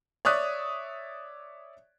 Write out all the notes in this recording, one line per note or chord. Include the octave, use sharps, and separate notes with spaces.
C#5 D5 E5 D#6 F#6